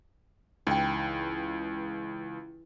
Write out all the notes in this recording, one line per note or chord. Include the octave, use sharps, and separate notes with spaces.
C#2 E3 D#4 G5